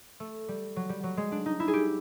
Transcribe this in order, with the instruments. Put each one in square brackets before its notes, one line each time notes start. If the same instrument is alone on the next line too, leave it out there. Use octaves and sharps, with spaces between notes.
[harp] A3
G3
F#3
G3
F#3
G#3
D4
D#4
E4
G#4
G4